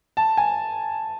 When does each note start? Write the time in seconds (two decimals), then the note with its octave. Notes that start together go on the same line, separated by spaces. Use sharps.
0.17 A5
0.37 G#5